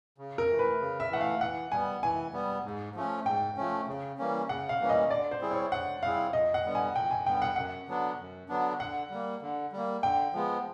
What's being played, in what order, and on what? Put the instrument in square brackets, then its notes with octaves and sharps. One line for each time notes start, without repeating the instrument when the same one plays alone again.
[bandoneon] C#3
[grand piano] A#4
[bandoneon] E3 A3
[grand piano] B4
[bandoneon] C#3
[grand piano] E5
[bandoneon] E3 A3 [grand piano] F#5
[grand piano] F5
[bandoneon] E3 [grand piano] F#5
[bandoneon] G3 B3 [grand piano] G#5
[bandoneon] E3 [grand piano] G#5
[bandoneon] G3 B3
G#2
F3 A3 C#4
[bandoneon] G#2 [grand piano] G5
[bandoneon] F3 A3 C#4
C#3
E3 G3 A#3 C#4
[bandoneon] C#3 [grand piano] F#5
[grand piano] F5
[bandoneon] E3 G3 A#3 C#4
[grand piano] D#5
[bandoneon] D3 [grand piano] D5
[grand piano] C5
[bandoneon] G3 C4 E4 G#4
[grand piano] C#5
[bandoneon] D3 [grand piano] F#5
[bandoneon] G3 C4 E4 G#4 [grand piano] F5
[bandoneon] F2 [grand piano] D#5
[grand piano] F#5
[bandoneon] D3 G3 B3
[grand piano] G#5
[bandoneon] F2 [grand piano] G5
[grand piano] G#5
[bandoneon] D3 G3 B3 [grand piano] G5
[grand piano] F#5
[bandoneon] F#2 [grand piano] F#5
[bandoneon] D3 F#3 B3 D4
F#2
D3 F#3 B3 D4
[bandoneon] D3 [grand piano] F#5
[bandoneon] G3 A#3
D3
G3 A#3
[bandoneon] D3 [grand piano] G5
[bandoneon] F3 G#3 B3